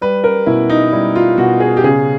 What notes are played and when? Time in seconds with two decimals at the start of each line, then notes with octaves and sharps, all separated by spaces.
0.01 G3 B4
0.24 A#4
0.46 B2 E4
0.70 D#4
0.92 G3 E4
1.16 F4
1.38 B2 F#4
1.60 G#4
1.77 G4
1.84 C#3 G#4